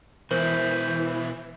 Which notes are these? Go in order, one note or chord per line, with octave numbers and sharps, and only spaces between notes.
B2 E3 E4 A#4 C5 G6